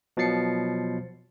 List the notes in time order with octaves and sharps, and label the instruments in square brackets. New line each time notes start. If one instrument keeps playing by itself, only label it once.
[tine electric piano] B2 F3 F#3 A6 C7 C#7